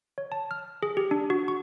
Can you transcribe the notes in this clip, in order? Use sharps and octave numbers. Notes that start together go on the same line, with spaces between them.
C#5
A5
F6
G#4
G4
D4
F#4
C#6